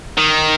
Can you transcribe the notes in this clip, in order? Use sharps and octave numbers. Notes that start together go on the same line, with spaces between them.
D#3